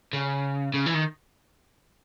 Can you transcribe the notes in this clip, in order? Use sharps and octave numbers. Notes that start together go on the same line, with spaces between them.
C#3
C#3
E3
D#3